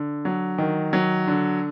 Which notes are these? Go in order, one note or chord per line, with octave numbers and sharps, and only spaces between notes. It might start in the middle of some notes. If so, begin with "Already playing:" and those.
Already playing: D3
F#3
D#3
F#3
D3